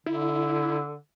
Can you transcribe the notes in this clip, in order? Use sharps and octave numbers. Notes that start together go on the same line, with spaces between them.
D3 E4